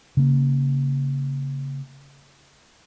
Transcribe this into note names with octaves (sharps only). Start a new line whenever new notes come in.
C#3 A#3